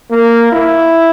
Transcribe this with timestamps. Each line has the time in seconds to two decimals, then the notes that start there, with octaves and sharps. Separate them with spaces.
0.11 A#3
0.52 E4